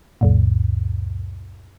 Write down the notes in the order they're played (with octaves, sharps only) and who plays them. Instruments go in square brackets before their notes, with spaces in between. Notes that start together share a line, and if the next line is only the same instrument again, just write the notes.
[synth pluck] C#2 F#2 A#2